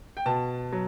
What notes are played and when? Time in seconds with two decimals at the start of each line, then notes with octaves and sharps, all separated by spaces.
0.17 G5
0.26 B2 A5
0.72 F#3